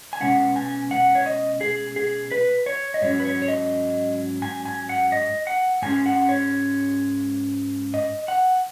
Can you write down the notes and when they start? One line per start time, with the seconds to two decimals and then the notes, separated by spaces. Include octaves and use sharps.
0.13 G#5
0.20 B2 G#3 C#4 F#5
0.56 G#5
0.91 F#5
1.15 C#5
1.26 D#5
1.61 G#4
1.96 G#4
2.32 B4
2.66 C#5
2.94 D#5
3.02 G#2 F#3 C#4 C#5
3.20 B4
3.25 C#5
3.42 C#5
3.48 D#5
4.42 G#5
4.65 G#5
4.89 F#5
5.12 D#5
5.47 F#5
5.82 G#2 G#3 C#4 G#5
6.06 F#5
6.29 C#5
7.94 D#5
8.28 F#5